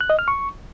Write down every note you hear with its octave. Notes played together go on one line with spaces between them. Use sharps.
F#6
D#5
F6
C#6